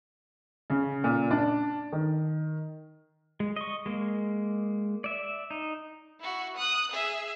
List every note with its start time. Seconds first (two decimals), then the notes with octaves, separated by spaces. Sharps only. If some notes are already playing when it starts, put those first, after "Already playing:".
0.70 C#3
1.04 A#2
1.31 D4
1.92 D#3
3.40 G#3
3.56 D#5 C#6
3.86 G#3 A#3
5.04 D5 E5
5.51 D#4
6.20 E4 F#4
6.57 D#6 F#6
6.92 G#4 E5